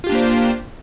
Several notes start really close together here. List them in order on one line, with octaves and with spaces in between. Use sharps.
F4 G4 D4 A#3 C5